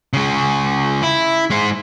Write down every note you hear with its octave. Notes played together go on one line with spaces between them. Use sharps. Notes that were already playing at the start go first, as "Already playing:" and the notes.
C#3 G#3
E4
G#3 C5